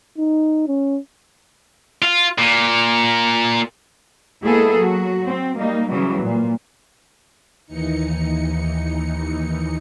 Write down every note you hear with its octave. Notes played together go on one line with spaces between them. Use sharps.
D#4
C#4
F4
A#2
G#3 A#3 B3 E4 G#4 A4
F#3 F#4
C4
G3 A#3 D#4
C#3 E3 F#3 G3
A#2
D#2 E3 D#4 C#7